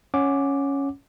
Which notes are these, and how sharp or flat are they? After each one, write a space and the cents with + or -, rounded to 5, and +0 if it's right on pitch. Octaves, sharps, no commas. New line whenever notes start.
C#4 +0 F#5 -5 D6 +0